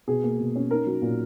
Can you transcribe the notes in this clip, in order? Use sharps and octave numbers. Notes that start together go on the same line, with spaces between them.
B2 G#4
A#3
B2
C#4
D#4 A#4
F#3
A#2